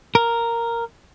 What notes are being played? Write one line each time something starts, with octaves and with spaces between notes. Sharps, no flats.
A#4